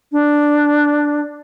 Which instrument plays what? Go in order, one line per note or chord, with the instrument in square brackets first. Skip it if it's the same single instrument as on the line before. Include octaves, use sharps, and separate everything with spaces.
[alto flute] D4